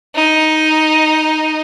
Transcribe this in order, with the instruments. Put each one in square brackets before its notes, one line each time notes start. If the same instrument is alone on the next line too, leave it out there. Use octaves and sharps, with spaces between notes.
[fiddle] D#4